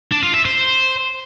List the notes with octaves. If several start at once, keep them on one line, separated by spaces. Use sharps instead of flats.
D4
F4
E5
C5